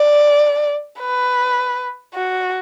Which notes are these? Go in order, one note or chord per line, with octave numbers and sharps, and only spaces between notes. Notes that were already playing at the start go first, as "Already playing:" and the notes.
Already playing: D5
B4
F#4